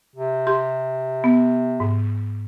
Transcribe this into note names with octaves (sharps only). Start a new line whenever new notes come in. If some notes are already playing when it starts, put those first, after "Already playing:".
C3
G4 C6
B3
G#2